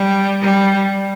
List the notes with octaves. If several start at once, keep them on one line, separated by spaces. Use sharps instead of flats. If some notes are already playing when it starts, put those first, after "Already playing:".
Already playing: G3
G3